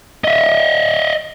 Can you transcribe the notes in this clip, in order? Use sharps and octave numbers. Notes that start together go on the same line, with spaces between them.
D#5 E5